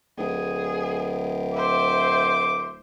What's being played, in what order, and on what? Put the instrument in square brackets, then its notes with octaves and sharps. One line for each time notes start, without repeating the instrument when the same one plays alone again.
[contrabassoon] D1 [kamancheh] G#4
[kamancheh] C5 E5 [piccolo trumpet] D6